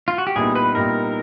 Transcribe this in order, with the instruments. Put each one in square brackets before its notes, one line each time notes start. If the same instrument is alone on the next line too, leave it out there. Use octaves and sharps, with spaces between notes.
[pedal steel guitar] F4
F#4
G4
[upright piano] C2 A#2 G3 B3 D#4 [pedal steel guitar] G#4
[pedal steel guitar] B4
[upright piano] C2 A#2 G3 B3 D#4 [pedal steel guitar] A#4